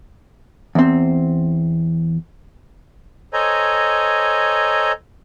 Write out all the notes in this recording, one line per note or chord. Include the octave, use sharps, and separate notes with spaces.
E2 C4
A4 C5 C#5 D#5 G#5 A#5